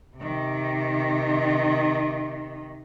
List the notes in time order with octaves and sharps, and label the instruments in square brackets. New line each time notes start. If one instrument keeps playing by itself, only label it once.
[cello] C3 D#3